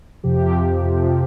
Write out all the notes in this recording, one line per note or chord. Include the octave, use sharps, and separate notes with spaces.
F2 C3 F3 G4
F2 C3 F3